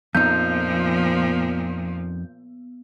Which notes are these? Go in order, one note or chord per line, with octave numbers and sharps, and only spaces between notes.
F2 A#2 F3 B3 D#4 G6